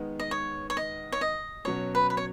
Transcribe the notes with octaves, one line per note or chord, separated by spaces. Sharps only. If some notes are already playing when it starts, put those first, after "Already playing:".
Already playing: D#3 G#3 B3
D#5
C#5
C#5
D#5
C#5
D#5
B2 F#3 C#4 C#5
B4
B4
C#5